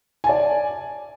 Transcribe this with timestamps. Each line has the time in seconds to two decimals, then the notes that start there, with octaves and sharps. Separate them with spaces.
0.24 G#5
0.27 A5
0.29 D5